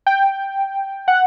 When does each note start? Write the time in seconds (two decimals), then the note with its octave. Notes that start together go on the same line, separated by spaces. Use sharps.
0.07 G5
1.08 F#5